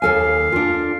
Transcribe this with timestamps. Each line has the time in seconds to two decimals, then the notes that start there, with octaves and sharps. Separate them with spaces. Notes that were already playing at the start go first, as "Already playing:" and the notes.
0.02 D#2 A4 F5 G#5
0.52 D4 F4